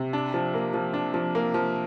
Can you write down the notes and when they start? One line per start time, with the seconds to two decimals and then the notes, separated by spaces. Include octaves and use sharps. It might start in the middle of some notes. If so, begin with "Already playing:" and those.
Already playing: C3
0.13 D4
0.34 F3
0.54 A#3
0.74 F3
0.94 D4
1.14 F3
1.35 A#3
1.54 F3